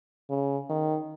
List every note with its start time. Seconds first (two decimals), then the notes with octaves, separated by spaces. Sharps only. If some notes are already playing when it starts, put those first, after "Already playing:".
0.30 C#3
0.70 D#3